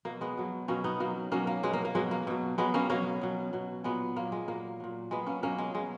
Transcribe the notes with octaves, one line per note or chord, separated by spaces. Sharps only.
B2 F#3 A#3
G#3 B3
B2 F#3
B2 F#3 A#3 C#4
B3 D#4
B2 F#3 A#3
B2 F#3 A#3 C#4
A#3
B2 F#3 G#3
A#3
A#3
B2 F#3 G#3
A#3
B2 F#3
B2 F#3 G#3 B3
A#3 C#4
B2 F#3 A#3 C#4
B2 F#3
B2 F#3
A#2 F#3 G#3 B3
A#2 F#3 A#3
G#3
A#2 F#3 A#3
A#2 F#3
B2 F#3 G#3 B3
A#3 C#4
B2 F#3 A#3 C#4
G#3
B2 F#3 G#3